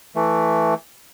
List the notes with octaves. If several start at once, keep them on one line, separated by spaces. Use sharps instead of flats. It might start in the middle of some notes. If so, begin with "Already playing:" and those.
E3 A3